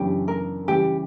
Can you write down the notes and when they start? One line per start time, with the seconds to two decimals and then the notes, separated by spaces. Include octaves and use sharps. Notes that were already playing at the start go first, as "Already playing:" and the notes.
Already playing: F#2 C#3 E3 B3 D4 G4
0.28 A#4
0.68 C#3 E3 G3 G4